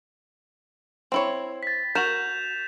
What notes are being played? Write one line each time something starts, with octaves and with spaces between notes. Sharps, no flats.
C4 E4 C#5
A6 B6
F#4 A#4 G6 E7 F7